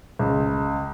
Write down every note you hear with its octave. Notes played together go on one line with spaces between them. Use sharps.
C#2